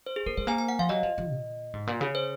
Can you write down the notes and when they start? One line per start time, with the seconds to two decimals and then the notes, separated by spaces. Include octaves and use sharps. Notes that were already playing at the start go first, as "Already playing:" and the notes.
0.06 C5
0.16 G#4
0.26 A#3 A#4
0.38 G#3 C5
0.47 A#3 G#5
0.58 G#5
0.69 F#5
0.79 F3 F5
0.89 F#3 D#5
1.03 F3
1.18 F3
1.31 A#2
1.73 G#2
1.87 A#2
2.01 C#3
2.15 C5